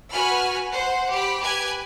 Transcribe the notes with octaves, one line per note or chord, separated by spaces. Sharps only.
F#4 B4 G#5 B5 F6
C5 F#5
G4 B5
G4 B4 G#5 G#6